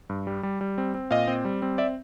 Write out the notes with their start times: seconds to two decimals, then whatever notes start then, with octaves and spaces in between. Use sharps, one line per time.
0.09 G2
0.27 G3
0.43 G3
0.61 G3
0.78 C4
0.94 C4
1.11 A#2 D#5 F5
1.28 C4
1.45 G3
1.62 C4
1.78 D5 E5